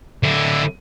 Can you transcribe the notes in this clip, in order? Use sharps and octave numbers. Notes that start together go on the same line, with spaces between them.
D3 E4